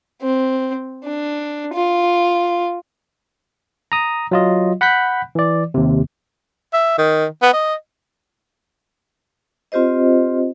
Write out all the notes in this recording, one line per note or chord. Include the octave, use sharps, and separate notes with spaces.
C4
D4
F4
A#5 D#6
F#3 F4 D#5
F#5 B5 F#6 G6 B6
E3 D5
D#2 C3
E5
D#3
B3
D#5
C4 F4 G4 C5 D#5